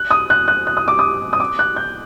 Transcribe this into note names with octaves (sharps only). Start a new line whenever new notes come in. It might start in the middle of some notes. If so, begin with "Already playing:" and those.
Already playing: F#6
D#6
F#6
F#6
F#6
D#6
D6
D#6
D#6
D6
F#6
G6